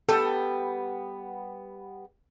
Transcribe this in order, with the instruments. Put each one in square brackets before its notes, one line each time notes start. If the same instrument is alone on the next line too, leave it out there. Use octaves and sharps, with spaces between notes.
[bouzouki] G3 B3 G5 [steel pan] A4